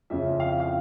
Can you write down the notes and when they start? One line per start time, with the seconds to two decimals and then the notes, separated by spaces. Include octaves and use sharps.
0.10 F2 C#3 F3 E5
0.40 F5
0.60 F5